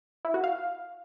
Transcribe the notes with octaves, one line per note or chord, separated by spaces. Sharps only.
E4
F#4
F5